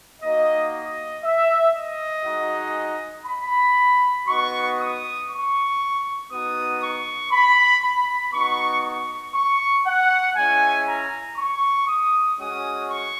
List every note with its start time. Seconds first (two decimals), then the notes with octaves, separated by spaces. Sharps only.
0.22 A#3 D#4 F#4 D#5
0.73 D#5
1.24 E5
1.75 D#5
2.26 G#3 D#4 F#4
3.26 B5
4.28 B3 D#4 F#4 C#6
4.79 D#6
5.30 C#6
6.31 B3 D#4 F#4 D#6
6.81 C#6
7.32 B5
7.83 B5
8.33 B3 D#4 F#4 C#6
8.85 C#6
9.34 C#6
9.86 F#5
10.36 G#3 C#4 E4 G#5
10.87 A#5
11.37 C#6
11.88 D#6
12.39 G#3 C#4 F#4 D#6
12.89 C#6